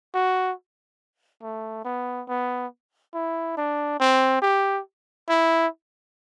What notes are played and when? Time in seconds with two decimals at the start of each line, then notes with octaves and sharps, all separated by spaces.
0.14 F#4
1.42 A3
1.85 B3
2.28 B3
3.14 E4
3.57 D4
4.00 C4
4.42 G4
5.29 E4